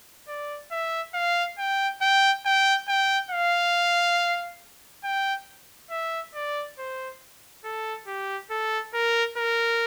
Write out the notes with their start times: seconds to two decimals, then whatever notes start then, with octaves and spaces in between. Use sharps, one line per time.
0.28 D5
0.71 E5
1.14 F5
1.58 G5
2.01 G5
2.45 G5
2.88 G5
3.30 F5
5.04 G5
5.90 E5
6.34 D5
6.78 C5
7.64 A4
8.07 G4
8.50 A4
8.94 A#4
9.37 A#4